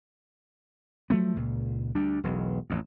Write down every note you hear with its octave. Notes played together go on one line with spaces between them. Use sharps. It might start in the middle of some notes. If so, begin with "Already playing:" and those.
F3 F#3 A3 B3
C#2 A#2
D2 G3 D4
E1 B1
A1 F2